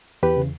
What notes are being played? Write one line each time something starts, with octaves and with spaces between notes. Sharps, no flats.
E2 G4 B4
C#3